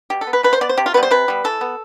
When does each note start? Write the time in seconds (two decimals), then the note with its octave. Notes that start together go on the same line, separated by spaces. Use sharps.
0.10 B2 G4
0.21 A4
0.27 B3
0.33 B4
0.43 B2 B4
0.53 C5
0.61 B3 D5
0.69 C5
0.77 C3 G4
0.86 F4
0.94 B3 B4
0.97 G3
1.03 C5
1.11 C3 B4
1.28 G3 B3
1.44 E3 A4
1.61 B3